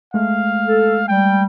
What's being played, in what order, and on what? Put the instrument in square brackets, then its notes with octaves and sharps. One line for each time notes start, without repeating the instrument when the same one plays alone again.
[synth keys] G#3 A3 [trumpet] F5
[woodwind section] A4
[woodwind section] G3 [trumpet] G5